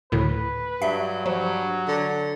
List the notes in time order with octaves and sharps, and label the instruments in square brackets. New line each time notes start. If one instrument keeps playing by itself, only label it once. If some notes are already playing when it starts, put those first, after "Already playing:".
[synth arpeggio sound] D2 A2 D3 [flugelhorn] B4
[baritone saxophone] G2 [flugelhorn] F#3 [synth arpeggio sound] E5
[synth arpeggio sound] F3 [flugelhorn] F#3
[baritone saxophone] D3